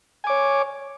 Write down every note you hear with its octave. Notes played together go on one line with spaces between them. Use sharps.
C#5 G#5 D6